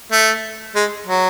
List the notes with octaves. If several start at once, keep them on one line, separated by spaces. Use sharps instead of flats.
A3
G#3
F#3